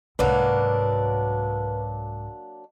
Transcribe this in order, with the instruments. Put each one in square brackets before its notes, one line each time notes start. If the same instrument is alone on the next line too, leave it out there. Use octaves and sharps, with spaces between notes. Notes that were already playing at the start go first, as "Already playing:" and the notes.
[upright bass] C2 G#2 [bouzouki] F#3 A#3 D4 [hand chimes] B4